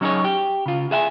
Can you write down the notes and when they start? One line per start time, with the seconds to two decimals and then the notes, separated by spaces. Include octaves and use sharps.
0.01 F#3 C#4 D#4 F#4 G#4 C#5
0.24 G4
0.66 C#3 F4
0.91 G#4 E5 F#5 G#5